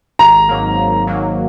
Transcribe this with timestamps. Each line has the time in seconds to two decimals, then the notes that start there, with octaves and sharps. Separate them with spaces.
0.19 G#1 A#5
0.49 G#2 F#3 A#3
0.78 G#1
1.07 G#2 F#3 A#3